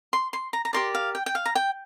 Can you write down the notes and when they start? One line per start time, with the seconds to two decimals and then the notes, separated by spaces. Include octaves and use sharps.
0.13 C6
0.33 C6
0.53 A#5
0.65 A#5
0.73 G4 A#4 D5 C6
0.95 F5
1.15 G5
1.26 G5
1.35 F5
1.46 A#5
1.55 G5